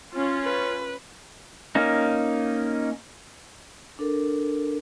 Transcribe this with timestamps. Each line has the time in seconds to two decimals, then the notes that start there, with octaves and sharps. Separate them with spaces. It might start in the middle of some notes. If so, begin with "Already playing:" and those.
0.12 C#4 F4
0.43 B4
1.75 A#3 C#4 D#4
3.99 D4 A4 A#4